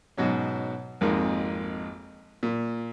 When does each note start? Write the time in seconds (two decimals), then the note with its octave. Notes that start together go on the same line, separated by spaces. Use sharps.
0.17 G#2 B2 F#3 C#4
1.01 G#1 F2 G#3 A#3 D#4
2.43 A#2